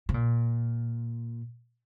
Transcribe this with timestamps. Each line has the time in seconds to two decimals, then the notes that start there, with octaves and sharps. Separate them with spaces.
0.09 C3
0.14 A#2